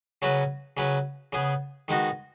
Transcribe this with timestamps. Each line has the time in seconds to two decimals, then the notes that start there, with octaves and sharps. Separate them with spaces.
0.22 C#3 F#3 C#4 F#4 B4
0.77 C#3 F#3 C#4 B4
1.33 C#3 B3 G#4
1.88 D#3 G#3 B3 D#4 F#4